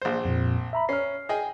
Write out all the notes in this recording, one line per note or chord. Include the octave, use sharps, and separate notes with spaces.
A#1 C5
F2 A#2
E5 A#5 B5
C#4 F6 C7
G#4 D#5 G5